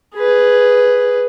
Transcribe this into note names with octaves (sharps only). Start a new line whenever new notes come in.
G#4 B4